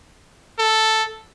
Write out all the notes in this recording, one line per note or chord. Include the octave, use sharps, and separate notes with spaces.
A4